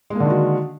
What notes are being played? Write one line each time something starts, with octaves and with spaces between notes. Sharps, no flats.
D3 D#3 G#3 A#3 F#4